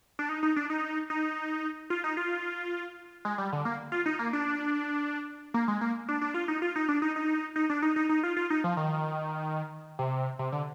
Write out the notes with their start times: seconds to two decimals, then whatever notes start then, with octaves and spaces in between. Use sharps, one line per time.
0.19 D4
0.29 D#4
0.43 D#4
0.56 D4
0.70 D#4
1.10 D#4
1.90 F4
2.04 D#4
2.17 F4
3.25 G#3
3.38 G3
3.53 D3
3.65 A#3
3.92 F4
4.06 D#4
4.19 A#3
4.33 D4
5.54 A#3
5.68 G#3
5.81 A#3
6.09 D4
6.21 D4
6.34 F4
6.48 D#4
6.62 F4
6.76 D#4
6.89 D4
7.02 D#4
7.16 D#4
7.56 D#4
7.70 D4
7.82 D#4
7.96 D#4
8.09 D#4
8.23 F4
8.37 F4
8.50 D#4
8.64 F3
8.77 D#3
9.99 C3
10.39 C3
10.52 D3